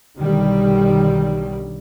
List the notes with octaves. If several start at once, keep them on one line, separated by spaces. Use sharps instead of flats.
B1 D3 D#3 G3